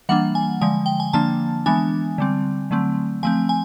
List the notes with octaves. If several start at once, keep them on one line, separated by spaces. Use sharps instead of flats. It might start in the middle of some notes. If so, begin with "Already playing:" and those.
E3 G3 A#3 D4 F#5
G#5
D3 F3 G#3 G#5
G5
G#5
D3 F3 A#3 D4 A5
E3 G#3 B3 D4 G#5
D3 G3 C4
D3 F#3 A3 C4
F3 A3 C4 G#5
G#5